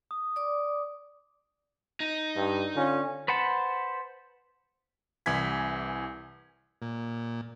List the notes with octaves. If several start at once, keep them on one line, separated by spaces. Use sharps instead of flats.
D#6
D5 D6
D#4
G2
D3 C#4 F4
B4 C5 F#5 A5 B5
C2 E3 G#5 G#6 B6
A#2